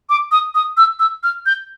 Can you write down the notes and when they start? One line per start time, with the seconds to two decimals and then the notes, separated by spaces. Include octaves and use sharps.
0.10 D6
0.32 D#6
0.55 D#6
0.77 E6
1.00 E6
1.23 F6
1.46 G6